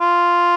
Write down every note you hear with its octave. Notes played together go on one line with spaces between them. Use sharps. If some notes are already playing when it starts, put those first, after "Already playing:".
F4